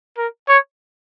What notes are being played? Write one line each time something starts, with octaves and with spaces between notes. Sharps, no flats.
A#4
C#5